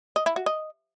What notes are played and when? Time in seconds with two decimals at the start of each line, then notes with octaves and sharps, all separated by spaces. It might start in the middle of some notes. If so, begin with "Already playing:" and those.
0.16 D#5
0.26 E4
0.36 F#4
0.46 D#5